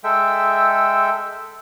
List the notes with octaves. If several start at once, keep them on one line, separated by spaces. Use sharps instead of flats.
G#3 A4 E5 G5